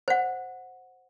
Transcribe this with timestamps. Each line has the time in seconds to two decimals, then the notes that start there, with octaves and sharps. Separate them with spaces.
0.08 C5 F#5